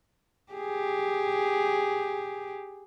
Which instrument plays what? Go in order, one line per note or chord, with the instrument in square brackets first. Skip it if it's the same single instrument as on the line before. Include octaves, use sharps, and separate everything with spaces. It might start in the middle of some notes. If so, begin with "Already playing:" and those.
[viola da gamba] G4 G#4